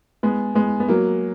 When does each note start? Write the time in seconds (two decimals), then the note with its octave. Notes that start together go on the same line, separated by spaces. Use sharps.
0.23 G#3 B3
0.55 G#3 B3
0.80 B3
0.88 F#3 A#3